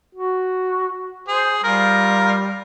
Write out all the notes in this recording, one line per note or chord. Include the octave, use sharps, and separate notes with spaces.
F#4
G#4 C5
G3 F4 A#4